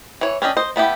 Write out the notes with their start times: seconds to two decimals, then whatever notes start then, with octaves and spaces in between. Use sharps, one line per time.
0.21 E3 C#5
0.42 C#4 D4 G4 D#5
0.57 C5 D#5
0.76 A3 B3 E4 G4